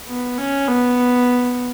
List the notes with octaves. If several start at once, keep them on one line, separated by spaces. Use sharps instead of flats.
B3
C#4
B3